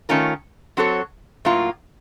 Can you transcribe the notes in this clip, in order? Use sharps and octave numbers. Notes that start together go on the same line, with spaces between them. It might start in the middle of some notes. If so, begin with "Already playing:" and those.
D#3 A3 C#4 F4 A#4
F#3 C4 F#4 A4 C#5
A2 F#3 A#3 F4